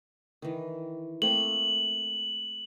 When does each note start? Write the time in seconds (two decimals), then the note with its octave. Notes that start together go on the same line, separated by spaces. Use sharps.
0.42 D#3 E3
1.22 A3 A#3 C4 F#7